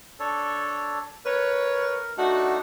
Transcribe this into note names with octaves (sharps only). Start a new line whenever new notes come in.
D4 A4 C#5
A#4 B4 C#5
A3 D4 D#4 F#4